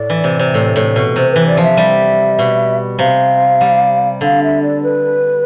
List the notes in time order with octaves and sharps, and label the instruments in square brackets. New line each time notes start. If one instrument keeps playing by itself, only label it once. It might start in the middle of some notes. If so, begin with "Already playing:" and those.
Already playing: [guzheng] A2 [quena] D5
[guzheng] E3
C3
C3
A2
A2
B2
[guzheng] C3 [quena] C5
[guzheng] E3 [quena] B4
[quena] D5
[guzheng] F3 [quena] E5
[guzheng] G3
B2
[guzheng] C3 [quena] F5
[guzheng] G3
[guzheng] D3 [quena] F5
[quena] E5
D5
B4